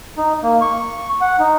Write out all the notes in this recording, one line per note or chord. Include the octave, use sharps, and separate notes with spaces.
D#4
A#3
C#6
F#5
D#4